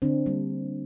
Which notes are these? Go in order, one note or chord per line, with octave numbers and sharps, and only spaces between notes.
D3 C4 D4
G3 A#3